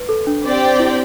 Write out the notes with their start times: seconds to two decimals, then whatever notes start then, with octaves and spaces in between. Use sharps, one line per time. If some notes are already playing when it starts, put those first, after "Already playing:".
Already playing: B4
0.09 A4
0.27 D4
0.45 C4 G4 D5 G5
0.80 E4